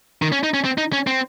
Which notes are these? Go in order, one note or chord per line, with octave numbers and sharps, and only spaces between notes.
D#3
C#4
D#4
C#4
C4
D#4
C#4
C4